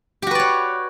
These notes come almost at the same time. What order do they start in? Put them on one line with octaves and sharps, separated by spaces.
G4 F#4 B4 D5 C#5